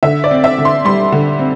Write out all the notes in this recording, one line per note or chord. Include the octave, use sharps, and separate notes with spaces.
D3 E5
D5
C4
E5
D3
C6
G3 C6
D3
C4